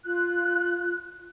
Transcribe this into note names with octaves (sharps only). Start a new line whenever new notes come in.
F4 F#6